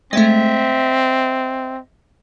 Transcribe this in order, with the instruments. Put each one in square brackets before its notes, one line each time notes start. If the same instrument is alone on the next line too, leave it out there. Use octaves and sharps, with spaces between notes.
[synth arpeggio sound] G#3 A3 [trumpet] C4 [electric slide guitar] D#5 E5